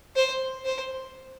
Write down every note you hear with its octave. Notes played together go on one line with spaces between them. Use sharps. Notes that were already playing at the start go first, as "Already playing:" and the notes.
C5
C5